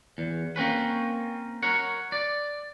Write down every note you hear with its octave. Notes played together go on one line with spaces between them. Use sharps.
E2
A#3 C4 C#4 B4
A#4 C#5 F#5
D5